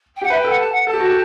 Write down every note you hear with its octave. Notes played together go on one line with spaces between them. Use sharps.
G5
G4 F#5
B4 E5
G5
A4
F#5
A5
F#5
A4 A5
G4
F#4
G4